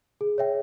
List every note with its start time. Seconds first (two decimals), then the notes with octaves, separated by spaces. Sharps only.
0.21 G#4
0.38 C#5 E5 G5